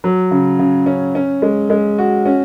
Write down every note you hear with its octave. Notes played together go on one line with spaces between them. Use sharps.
F#3
C#3
C#3
C#4
C#4
G#3
G#3
F#4
C#4